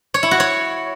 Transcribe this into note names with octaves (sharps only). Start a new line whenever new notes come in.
C#5
E4
F#4
C#5